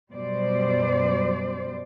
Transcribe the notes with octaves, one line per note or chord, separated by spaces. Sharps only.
F#2 B2 G3 C5 D5